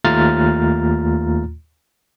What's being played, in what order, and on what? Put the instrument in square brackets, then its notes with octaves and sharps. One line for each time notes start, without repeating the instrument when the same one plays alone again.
[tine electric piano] D#2 A3 F4 A#5 F6 A6